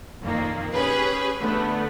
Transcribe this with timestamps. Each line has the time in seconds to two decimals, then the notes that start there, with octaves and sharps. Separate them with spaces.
0.22 F2 A#2 D#3 A#3
0.74 C#4 G4 G#4 B4
1.39 D3 A3 B3